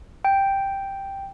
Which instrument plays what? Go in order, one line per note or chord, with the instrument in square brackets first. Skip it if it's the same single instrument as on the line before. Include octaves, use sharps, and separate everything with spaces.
[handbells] G5